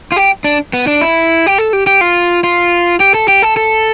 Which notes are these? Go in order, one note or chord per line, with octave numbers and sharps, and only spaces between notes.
F4
G4
D4
B3
D4
E4
G4
A4
G4
G4
F4
F4
G4
A4
G4
A4
A4